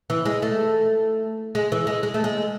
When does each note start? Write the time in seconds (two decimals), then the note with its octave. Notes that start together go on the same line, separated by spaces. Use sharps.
0.10 E3
0.25 G#3
0.42 A3
1.55 G#3
1.72 E3
1.87 G#3
2.03 G#3
2.14 A3
2.24 G#3